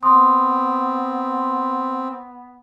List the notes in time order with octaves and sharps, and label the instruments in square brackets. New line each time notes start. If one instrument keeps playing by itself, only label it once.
[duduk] B3 [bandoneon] C4 [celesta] C6 D#6